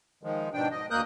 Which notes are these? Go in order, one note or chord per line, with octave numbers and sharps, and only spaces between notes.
D#3 F3 G#3
G#2 B2 D4 G5
D#5
D2 A#3 A#4 D#6 F#6 G6